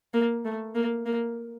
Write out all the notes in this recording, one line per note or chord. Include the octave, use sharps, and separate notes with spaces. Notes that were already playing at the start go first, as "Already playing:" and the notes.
A#3
A3
A#3
A#3